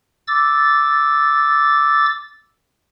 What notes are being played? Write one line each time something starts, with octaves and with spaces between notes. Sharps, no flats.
D6 E6 A6